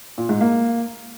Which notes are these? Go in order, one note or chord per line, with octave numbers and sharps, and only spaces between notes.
A#2
G#2
A#3